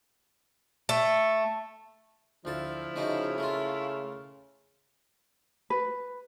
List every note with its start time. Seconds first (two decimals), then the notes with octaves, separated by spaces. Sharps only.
0.89 A3
2.45 D2 F3 E4 A4 F5
2.96 C#3 A3 D#4 F#4
3.38 A3 A#3 F4
5.70 B4